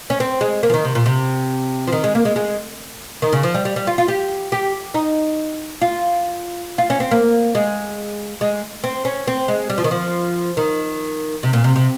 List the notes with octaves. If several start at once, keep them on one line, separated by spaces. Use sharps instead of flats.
C#4
C4
G#3
A#3
F3
D#3
C3
A#2
C3
F3
D#3
G#3
A#3
G#3
G#3
D#3
C#3
F3
G3
G3
G3
F4
F4
G4
G4
D#4
F4
F4
C#4
C4
A#3
G#3
G#3
C4
C#4
C4
G#3
G3
F3
D#3
F3
D#3
C3
A#2
C3
C3